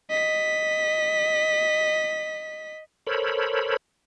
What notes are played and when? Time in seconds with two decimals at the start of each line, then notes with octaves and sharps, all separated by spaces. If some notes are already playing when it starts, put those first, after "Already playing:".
0.10 D#5 B6
3.07 A4 A#4 C5 C#5 B5